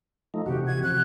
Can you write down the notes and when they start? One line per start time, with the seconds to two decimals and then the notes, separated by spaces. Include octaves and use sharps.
0.34 F3 A3 D#4
0.46 C3 E3 F#4 G4
0.67 G#6
0.83 C3 F3 F#6